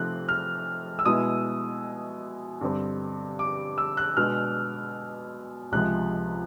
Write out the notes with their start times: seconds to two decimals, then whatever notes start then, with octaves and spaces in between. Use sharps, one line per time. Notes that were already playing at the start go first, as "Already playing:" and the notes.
Already playing: C3 F3 A3 C4 D#4 F#6
0.29 F6
0.99 E6
1.05 B2 G#3 B3 E4 D#6
2.61 G2 D3 G3 C4
3.39 D6
3.78 E6
3.97 F#6
4.17 B2 G#3 B3 D4 F6
5.72 C#2 C3 F3 G#3 F#6